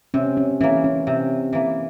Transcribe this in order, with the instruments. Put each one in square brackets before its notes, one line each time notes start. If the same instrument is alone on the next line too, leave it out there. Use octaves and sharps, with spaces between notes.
[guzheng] C3 [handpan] C#4
[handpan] C#4
[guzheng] E3 A#3 [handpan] C#4
[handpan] C#4
[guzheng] C3
E3 A#3